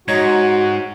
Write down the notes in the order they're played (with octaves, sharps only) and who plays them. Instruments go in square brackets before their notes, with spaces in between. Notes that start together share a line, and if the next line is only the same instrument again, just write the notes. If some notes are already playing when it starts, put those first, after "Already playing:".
[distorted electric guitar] G#2 [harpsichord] D#4 C#5 A#5 [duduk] F#4 [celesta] G#6